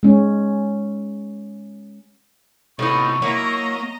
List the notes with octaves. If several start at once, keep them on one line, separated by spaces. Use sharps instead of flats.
G#3 C#4
A2 C3 B3 D#4 D#5 C#6
F#3 A#3 E4 D#5 A#5